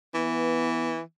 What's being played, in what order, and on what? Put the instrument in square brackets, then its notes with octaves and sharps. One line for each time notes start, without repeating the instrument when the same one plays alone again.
[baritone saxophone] E3 [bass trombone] B3